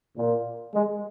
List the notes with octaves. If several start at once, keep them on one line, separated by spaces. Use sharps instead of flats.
A#2
G#3